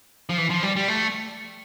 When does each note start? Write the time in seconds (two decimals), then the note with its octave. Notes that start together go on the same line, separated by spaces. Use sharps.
0.29 F3
0.38 E3
0.50 F3
0.63 G3
0.76 G3
0.88 A3